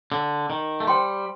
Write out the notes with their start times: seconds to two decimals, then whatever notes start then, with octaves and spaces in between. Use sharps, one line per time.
0.12 D3
0.50 D#3
0.80 A3
0.87 G3 C5 G5 C6